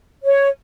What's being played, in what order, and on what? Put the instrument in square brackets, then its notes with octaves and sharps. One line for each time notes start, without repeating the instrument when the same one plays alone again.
[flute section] C#5